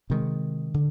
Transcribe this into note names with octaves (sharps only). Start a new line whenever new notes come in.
C3 D#3 G#3
D3